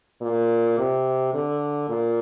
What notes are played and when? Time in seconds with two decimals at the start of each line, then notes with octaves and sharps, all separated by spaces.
0.21 A#2
0.78 C3
1.34 D3
1.89 A#2